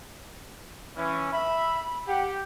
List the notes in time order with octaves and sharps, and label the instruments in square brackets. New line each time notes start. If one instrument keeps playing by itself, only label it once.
[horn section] E3 C#4
[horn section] E5 [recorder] B5
[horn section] G4 [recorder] F#5